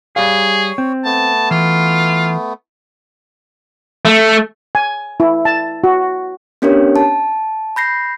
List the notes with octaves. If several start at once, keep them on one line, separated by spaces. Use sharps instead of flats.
G3 G#4 C#5 F5
C4
A3 B3 A5
E3 F4
A3
G#5
E4
A5
F#4
B3 C#4 D4 G4 A#4 C#5
A5
B5 G6 A#6 C7